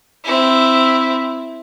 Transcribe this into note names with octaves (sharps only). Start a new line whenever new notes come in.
C4 E4